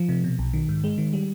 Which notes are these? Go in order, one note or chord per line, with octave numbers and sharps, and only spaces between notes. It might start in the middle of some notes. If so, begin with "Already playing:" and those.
Already playing: F3
C3
B2
B1
D#3
G#2
G#3
D#3
G3